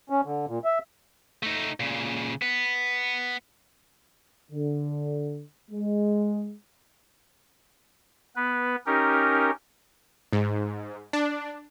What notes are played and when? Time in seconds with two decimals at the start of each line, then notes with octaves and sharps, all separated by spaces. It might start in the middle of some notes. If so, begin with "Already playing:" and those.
0.10 C#4
0.25 D3
0.48 A#2
0.65 E5
1.43 A3 D#4
1.80 A#2 C#3
2.42 B3
4.51 D3
5.71 G#3
8.36 B3 B4
8.86 C#4 D#4 G4 A#4
10.33 G#2
11.13 D4